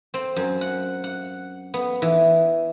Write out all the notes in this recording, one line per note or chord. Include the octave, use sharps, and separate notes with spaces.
C4
F#2
F#5
F#5
B3
E3